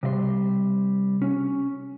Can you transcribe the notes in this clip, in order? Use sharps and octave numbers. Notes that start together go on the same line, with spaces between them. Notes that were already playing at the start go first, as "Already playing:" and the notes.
C3 G3 D#5 C6
C#4